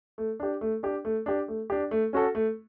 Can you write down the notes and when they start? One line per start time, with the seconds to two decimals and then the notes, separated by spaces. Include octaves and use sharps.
0.18 A3
0.40 D4 G4
0.61 A3
0.83 D4 G4
1.05 A3
1.26 D4 G4
1.48 A3
1.70 D4 G4
1.91 A3
2.13 C#4 F#4 A4
2.35 A3